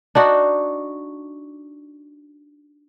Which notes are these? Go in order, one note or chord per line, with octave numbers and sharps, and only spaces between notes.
D4 D#4 F#4